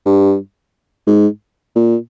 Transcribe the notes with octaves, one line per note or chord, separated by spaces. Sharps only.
G2
G#2
A#2